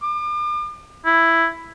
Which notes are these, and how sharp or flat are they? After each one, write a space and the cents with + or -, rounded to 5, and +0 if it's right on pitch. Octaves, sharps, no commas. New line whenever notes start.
D6 +40
E4 +5